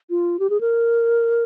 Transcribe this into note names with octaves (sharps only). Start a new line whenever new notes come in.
F4
G4
G#4
A#4